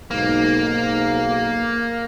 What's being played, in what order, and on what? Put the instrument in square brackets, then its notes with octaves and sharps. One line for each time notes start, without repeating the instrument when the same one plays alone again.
[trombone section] B1 G#2 [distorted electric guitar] A#3